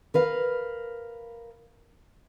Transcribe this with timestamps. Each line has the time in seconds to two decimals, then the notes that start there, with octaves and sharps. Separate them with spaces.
0.14 A#4 B4 F5